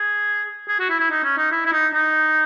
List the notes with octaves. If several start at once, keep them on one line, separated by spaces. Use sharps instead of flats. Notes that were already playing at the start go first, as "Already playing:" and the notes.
Already playing: G#4
G#4
F#4
E4
E4
D#4
C#4
D#4
E4
E4
D#4
D#4